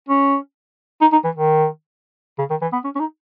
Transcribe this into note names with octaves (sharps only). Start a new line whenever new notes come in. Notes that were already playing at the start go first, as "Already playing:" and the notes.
C#4
D#4
D#4
E3
D#3
C#3
D#3
E3
B3
C#4
C#4
D#4